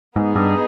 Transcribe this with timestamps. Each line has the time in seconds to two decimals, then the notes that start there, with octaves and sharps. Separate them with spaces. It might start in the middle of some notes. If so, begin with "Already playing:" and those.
0.16 G#2 B3 D#4 G#4
0.36 G2